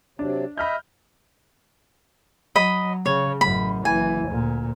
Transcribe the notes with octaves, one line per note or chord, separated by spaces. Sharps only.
C3 F#3 D4
D#5 E5 B5 F6 G6
F#3 D#5 B5
C#3 C#5
A1 F#2 B5
F#1 E3 G#5
D2 A#2